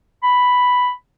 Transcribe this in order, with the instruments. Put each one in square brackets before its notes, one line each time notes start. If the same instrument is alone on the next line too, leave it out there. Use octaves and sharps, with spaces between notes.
[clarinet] B5